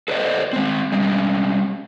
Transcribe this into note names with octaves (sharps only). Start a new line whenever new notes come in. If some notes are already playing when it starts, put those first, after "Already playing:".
A4 B4 C5 D5 D#5
G#3 C4
G3 G#3 C#4